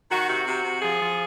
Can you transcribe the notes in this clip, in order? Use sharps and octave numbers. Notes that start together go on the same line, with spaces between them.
D#3 F#4
C3 F#4
C3
C3
F3 G#4
F3